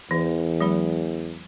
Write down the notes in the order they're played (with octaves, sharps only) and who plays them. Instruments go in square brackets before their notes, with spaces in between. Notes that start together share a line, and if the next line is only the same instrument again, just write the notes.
[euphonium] E2 [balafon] E3
[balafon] F#3 G#3 B5